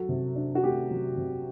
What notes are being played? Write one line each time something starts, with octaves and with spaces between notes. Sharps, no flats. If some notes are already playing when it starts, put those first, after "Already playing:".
Already playing: F#3 F#4 A4
C3
D4
F#4
A3 G4
F#3
C3